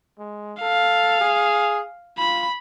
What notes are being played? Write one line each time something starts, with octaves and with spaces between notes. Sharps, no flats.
G#3
A4 F5
G#4
F4 B5